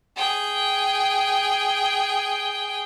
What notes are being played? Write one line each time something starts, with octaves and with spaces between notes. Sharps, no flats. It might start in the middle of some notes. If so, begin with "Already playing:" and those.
G#4 G5